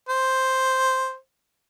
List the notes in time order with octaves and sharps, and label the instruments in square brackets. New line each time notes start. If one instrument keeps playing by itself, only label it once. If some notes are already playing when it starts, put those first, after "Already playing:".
[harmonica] C5